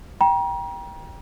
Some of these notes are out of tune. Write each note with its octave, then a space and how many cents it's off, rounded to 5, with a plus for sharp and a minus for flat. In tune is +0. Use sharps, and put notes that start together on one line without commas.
G5 +0 A#5 +35